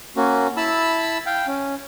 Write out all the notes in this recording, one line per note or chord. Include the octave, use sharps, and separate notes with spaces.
A#3 C#4 F#4
E4 A5 B5 E6
F5 G5
C#4